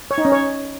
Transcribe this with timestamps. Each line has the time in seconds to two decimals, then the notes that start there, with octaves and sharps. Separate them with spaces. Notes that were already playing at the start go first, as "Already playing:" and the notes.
0.11 C#5
0.18 D#4
0.25 C#4
0.32 C#5